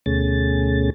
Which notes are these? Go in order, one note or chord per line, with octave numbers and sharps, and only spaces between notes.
D2 B2 A3 C#4 G#4 A6